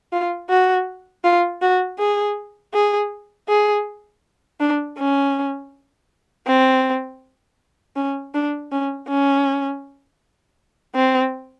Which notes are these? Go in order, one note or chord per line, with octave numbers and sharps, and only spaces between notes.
F4
F#4
F4
F#4
G#4
G#4
G#4
D4
C#4
C4
C#4
D4
C#4
C#4
C4